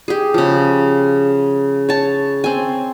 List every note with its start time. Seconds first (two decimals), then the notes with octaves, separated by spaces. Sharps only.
0.08 G4 G#4
0.34 C#3 F3
1.89 C#5 A5
2.44 C4 G#5